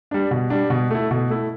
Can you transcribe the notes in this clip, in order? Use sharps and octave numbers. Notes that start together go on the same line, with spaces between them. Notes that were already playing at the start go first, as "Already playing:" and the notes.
G3 D4
B2
G3 D4
B2
A3 E4
B2
A3 E4